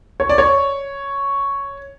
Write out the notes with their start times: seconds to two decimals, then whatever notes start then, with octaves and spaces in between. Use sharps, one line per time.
0.20 C#5
0.29 D5
0.38 C#5